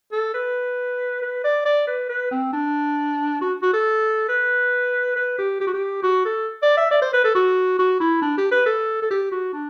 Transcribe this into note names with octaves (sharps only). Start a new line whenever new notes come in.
A4
B4
B4
D5
D5
B4
B4
C4
D4
F#4
F#4
A4
B4
B4
G4
G4
F#4
G4
F#4
A4
D5
E5
D5
C5
B4
A4
F#4
F#4
E4
D4
G4
B4
A4
A4
G4
F#4
D4